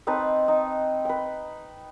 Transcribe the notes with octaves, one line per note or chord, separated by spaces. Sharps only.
C4 D#4 B4 A5
D#4
B4 G5